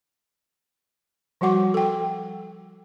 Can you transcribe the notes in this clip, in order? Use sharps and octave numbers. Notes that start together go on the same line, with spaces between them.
F3 G3 F#4 F#5 D6
A4 G5